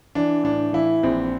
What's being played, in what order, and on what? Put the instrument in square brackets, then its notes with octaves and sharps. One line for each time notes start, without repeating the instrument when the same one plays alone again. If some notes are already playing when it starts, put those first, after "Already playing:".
[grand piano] E3 D4
A2 D4
E3 E4
A#1 C4